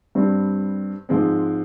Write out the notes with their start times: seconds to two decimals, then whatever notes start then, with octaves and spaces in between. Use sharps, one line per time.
0.15 G2 G3 C4
1.09 G#2 F3 G#3 C4